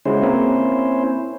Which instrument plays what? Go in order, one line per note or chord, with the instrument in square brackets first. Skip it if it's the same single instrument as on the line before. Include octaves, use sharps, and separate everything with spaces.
[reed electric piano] C#3 G#3 F#4 [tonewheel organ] C#4 E4 C5
[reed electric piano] A#3 C4 G#5